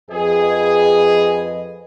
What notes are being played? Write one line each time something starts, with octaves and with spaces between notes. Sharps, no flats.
F2 G#4 B4 D#5